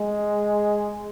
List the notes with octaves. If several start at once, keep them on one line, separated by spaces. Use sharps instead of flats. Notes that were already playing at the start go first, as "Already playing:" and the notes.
Already playing: G#3